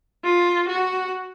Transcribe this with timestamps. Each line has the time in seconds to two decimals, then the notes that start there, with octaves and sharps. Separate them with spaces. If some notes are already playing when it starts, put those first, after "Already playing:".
0.25 F4
0.68 F#4